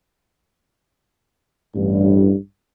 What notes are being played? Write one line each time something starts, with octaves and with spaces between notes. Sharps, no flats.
A1 G2